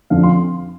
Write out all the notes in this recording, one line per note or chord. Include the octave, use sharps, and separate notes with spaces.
F2 D3 F3 C4 F5
C6